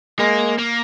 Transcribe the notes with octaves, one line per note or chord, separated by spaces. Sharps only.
G#3 A#3
A#3